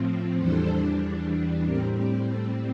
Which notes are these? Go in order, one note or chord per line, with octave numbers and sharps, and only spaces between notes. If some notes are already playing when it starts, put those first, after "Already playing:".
Already playing: A2 F3 C4
E2 E3 G3 D4 A4 C5
A2 G3 C4 G4 A#4
G4
A4